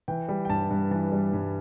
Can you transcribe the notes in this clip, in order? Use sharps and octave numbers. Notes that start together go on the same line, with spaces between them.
E3 G5
G3
G5
G2 A5
G2
E3 A5
G3
G2